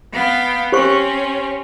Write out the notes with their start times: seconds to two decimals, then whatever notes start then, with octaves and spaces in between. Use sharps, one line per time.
0.13 B3 F5 G5
0.72 C4 C#4 G4 C5 C#6